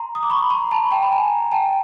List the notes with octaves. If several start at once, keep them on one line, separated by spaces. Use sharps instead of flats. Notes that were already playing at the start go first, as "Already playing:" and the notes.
Already playing: A#5 C6
D#6
D6
B5 C#6
A#5 C6
A5 B5
G5 A5
B5
G#5 A#5
G5 A5